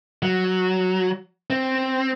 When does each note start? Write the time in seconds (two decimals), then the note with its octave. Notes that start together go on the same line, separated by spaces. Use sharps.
0.22 F#3
1.50 C4